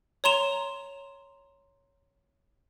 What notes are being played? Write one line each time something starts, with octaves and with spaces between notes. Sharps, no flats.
C#5 A#5 C6 E7 F7